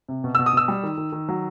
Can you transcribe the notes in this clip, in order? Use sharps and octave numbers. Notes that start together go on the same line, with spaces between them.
C3
B2
B2 E6
D#6
B2 E6
G3
D#3
D#3
D#3
F#3